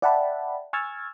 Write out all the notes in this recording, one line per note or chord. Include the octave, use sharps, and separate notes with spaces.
D5 E5 F#5 G5 A5 B5
G#5 C#6 E6 F6 G#6 A6